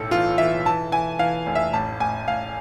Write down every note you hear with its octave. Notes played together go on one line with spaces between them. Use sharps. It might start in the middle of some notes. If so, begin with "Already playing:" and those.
Already playing: B1 A2 A4
E3 F4
E3 E5
E3 A5
E3 G#5
E3 F5
F1
E5
A1 A5
A1 G#5
A1 F5